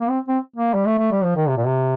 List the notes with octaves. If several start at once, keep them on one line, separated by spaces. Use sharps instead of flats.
A#3
C4
C4
A#3
G3
A3
A3
G3
F3
D#3
C3
A#2
C3